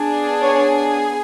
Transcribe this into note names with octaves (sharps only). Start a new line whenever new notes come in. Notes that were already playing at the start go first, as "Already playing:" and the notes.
Already playing: B3 D4 G#4
C#5